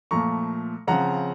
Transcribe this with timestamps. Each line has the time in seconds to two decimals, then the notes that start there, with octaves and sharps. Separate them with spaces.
0.11 A#2 F3 A3 A#5 C#6
0.87 C#3 F3 C4 F#5 A#5